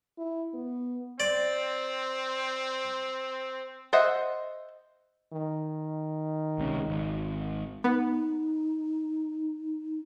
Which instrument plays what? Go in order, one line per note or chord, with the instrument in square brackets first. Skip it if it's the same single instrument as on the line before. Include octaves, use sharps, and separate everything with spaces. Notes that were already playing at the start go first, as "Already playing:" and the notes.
[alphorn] E4
B3
[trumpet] C4 [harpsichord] D5
[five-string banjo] C5 D#5 E5 F#5
[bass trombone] D#3
[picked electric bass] C#2 C3 C#4
G#1
[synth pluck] B3 [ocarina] D#4